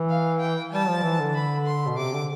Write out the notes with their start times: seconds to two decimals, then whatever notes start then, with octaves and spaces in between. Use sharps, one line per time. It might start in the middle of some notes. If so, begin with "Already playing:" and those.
Already playing: E3
0.09 F5
0.40 G5
0.72 G3 A5
0.88 F3
1.03 E3
1.20 D3
1.34 B5
1.66 C6
1.87 B2
1.97 C3 D6
2.14 D3